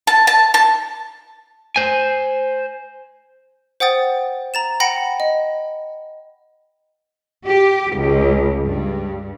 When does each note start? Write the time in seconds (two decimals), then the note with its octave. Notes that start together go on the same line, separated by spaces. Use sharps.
0.07 A5
0.27 A5
0.54 A5
1.76 C5 G#5
3.80 C5 F#5 G5 D#6 A6
4.54 A#5 A6 E7
4.80 F#5 G5 B5 A#6 C#7
5.20 D#5
7.45 G4
7.95 C#2
8.64 G2